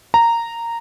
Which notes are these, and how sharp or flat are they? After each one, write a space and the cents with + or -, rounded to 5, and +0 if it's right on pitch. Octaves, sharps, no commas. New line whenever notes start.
A#5 -10